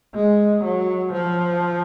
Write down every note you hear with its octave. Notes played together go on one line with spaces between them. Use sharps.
G#3
F#3
F3